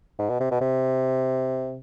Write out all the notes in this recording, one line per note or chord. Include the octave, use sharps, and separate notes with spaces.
G#2
B2
C3
B2
C3